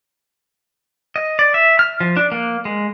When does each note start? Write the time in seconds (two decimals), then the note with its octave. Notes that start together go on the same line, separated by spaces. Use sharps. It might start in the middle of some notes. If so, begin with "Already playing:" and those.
1.16 D#5
1.39 D5
1.54 E5
1.79 F6
2.00 F3
2.17 D4
2.32 A#3
2.65 G#3